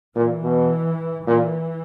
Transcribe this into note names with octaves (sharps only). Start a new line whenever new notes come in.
A#2 E3
B2
A#2 E3